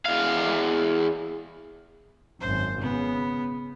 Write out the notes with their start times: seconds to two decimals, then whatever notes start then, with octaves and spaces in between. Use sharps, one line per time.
0.05 E2 F5
2.40 G#1 F#2 C5
2.80 C#3 B3